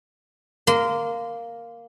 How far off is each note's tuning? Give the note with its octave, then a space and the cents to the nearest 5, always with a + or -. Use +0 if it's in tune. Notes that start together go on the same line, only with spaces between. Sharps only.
A#3 +0 C6 -25